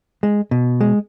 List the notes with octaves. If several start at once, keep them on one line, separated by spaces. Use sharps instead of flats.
G#3
B2
G#3